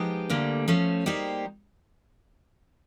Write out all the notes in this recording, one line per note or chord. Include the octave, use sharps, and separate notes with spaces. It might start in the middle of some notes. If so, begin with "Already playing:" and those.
Already playing: F3 G#3 B3 D#4 G4
D2 D3 G3 A#3
F3 A3 C#4
G3 A#3 D#4 G4 C5